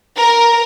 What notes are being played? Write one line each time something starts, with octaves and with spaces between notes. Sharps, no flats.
A#4